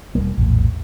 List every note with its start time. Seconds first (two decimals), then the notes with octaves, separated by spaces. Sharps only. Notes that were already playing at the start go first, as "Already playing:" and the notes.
0.15 E1 F#2 G3 A#3
0.38 A#1 E2 A2